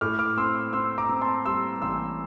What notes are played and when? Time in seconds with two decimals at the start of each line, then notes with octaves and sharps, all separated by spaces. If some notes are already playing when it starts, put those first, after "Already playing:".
0.01 A2 D6 F6
0.19 D6 F6
0.37 C4 C6 E6
0.73 C4 C6 E6
0.98 A#5 D6
1.09 C4
1.21 A5 C6
1.45 G3 C6 E6
1.82 A1 C6 E6